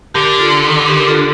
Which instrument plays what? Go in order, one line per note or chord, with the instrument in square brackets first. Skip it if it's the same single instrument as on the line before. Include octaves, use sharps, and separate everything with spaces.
[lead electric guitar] D3 [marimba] G4 A#4
[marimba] F4 A4
G4 A#4
F4 A4